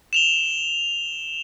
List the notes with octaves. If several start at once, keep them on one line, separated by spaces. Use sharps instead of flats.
E7 F7 G7